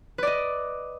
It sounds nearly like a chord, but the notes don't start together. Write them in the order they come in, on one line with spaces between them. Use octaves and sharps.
B4 D5 D#5